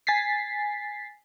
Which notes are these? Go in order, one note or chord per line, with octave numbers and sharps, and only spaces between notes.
G#5 A6 B6 C7